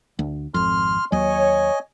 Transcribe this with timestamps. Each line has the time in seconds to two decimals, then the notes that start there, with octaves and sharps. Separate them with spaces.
0.19 D2
0.54 G#1 F2 C6 F6
1.12 D#2 F#3 C#5 D#5 G#5